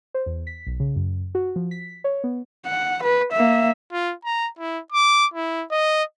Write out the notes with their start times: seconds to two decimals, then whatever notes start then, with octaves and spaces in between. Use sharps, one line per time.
0.14 C5
0.26 E2
0.47 B6
0.67 B1
0.80 C#3
0.96 F#2
1.35 F#4
1.56 F3
1.71 B6
2.04 C#5
2.24 B3
2.67 F#5
3.03 B4
3.33 A#3 E5
3.92 F4
4.25 A#5
4.59 E4
4.93 D6
5.34 E4
5.71 D#5